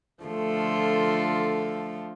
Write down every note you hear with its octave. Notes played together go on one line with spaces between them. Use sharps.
D3 F3 A3 F4